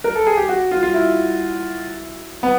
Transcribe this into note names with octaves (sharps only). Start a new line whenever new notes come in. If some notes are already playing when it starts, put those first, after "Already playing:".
A#4
A4
G#4
G4
F#4
F4
F4
E4
B3